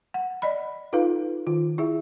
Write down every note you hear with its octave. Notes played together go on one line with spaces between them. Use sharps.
F#5
D5 D#5 B5
D#4 F4 A4 B4 F5
D#3 F4
E4 G#4 E5